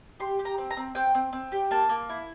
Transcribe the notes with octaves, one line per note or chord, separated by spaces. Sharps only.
G4 C6
G4
A#5
C4
A#5
C4
C4 G5
C4
C4
G4
A#3 A5
A#3
E4